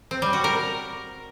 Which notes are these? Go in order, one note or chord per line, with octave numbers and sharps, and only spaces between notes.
C4
G3
F#4
A#4